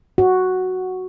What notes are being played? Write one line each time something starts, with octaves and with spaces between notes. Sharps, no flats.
F#4